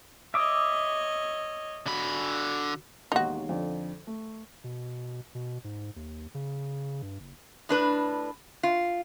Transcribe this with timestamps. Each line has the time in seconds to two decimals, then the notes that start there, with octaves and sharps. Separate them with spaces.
0.34 C#5 D#5 E5 D6 D#6
1.86 D3 F#4 B5
3.12 E1 D#2 D#4 F#4 C6
3.49 F2 D3
4.07 A3
4.64 B2
5.35 B2
5.64 G#2
5.96 D#2
6.34 C#3
7.02 G2
7.20 F#1
7.69 A2 D4 B4
8.63 F4